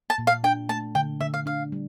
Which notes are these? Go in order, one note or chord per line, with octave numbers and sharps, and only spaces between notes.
A5
A#2
F5
D4 G5
A3 A5
D3 G5
D3 E5
F5
D4 F5
G3